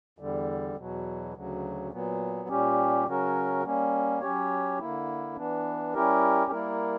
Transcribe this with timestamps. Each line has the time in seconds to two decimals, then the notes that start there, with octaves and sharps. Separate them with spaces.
0.19 E2 D3 G3
0.76 E2 B2 F#3
1.34 D2 C#3 F#3
1.91 A#2 F#3 B3
2.49 A#2 G3 C#4 G4
3.06 C#3 F#3 C#4 F#4 A#4
3.64 G3 A#3 C#4
4.21 F#3 C#4 G4 C#5
4.79 D3 A#3 E4
5.36 E3 B3 D4
5.94 G3 C#4 E4 G4 A#4
6.51 G3 A#3 E4 A#4